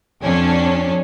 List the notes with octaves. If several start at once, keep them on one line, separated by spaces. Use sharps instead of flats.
F2 C#4 D4